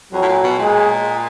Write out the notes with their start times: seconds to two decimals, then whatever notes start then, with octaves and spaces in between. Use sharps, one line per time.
0.13 F2 F#3
0.22 A2
0.28 A#2
0.43 B2
0.59 A#2 G#3